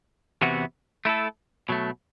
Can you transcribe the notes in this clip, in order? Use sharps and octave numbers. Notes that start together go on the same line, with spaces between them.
E2 C3 E3 B3 F#4
A3 E4 A4
B2 F#3 A3